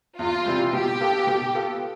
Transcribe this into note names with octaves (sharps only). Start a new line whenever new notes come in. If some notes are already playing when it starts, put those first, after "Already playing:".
E2 F4
C3 E3 G3
B2 G4
B3 F4 A4
B2
B3 F4 A4